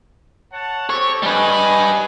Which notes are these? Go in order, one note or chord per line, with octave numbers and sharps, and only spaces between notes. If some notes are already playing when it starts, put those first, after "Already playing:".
C#5 F#5 A5
C4 G4 A4 C#5
G3 B4 D#5 G#5